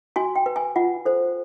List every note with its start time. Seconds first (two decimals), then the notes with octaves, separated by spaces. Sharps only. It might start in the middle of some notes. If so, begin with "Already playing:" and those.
0.16 F#4 G#5
0.36 G5
0.46 B4
0.56 G#5
0.76 F4 F#5
1.05 A4 C5